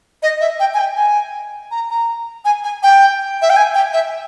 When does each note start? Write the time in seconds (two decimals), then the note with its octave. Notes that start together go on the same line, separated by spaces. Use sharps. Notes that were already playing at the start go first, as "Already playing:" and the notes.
0.23 D#5
0.41 E5
0.60 G5
0.74 G#5
0.79 G5
0.96 G#5
1.71 A#5
1.90 A#5
2.45 G#5
2.64 G#5
2.83 G5
3.42 E5
3.50 G5
3.57 G#5
3.75 G5
3.93 E5